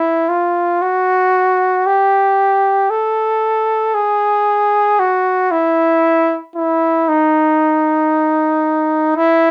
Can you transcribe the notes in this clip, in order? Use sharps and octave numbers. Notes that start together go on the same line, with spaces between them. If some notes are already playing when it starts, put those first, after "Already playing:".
Already playing: E4
F4
F#4
G4
A4
G#4
F#4
E4
E4
D#4
E4